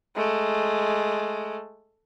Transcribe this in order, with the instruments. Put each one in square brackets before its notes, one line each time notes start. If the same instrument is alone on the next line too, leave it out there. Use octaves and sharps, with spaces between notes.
[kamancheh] G#3 A3